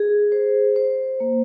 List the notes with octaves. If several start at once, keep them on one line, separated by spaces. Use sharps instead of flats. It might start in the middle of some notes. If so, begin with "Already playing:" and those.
Already playing: G#4
C5
C5
A#3